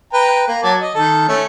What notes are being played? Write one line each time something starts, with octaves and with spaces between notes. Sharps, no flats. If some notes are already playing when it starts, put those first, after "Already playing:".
B4 G5 A#5
A#3
F#3 A5 D6
D#5
D#3 A4
A3 C#4